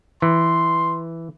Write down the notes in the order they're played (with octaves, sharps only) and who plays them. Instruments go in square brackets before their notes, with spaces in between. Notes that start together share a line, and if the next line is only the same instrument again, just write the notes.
[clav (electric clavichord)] E3 [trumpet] C6